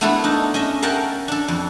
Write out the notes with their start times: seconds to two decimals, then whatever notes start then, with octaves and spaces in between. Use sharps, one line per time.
0.01 A3 B3 D4 E4 F4 A4
0.24 D4 D#4
0.54 C#4 D#5 E5
0.82 A#4 E5 F#5 G5 A5
1.28 D4 A4
1.48 F2